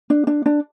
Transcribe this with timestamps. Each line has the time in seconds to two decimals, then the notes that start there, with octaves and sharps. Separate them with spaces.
0.10 D4
0.27 D4
0.46 D4